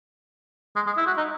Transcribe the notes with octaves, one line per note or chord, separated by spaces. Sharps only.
G#3
G#3
E4
F#4
D#4